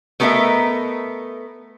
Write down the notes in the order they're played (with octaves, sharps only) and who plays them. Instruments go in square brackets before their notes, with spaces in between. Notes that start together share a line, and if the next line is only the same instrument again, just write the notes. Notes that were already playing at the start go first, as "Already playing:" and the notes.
[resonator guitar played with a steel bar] A3 B3 A4 A#4 D#5 E5